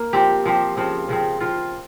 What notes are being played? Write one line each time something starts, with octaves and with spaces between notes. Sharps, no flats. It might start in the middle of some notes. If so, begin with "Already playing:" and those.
Already playing: A#3
F3 C4 G4
F3 C4 G4
C#3 F3 C4
C#3 F3 C4
F3 C4 F4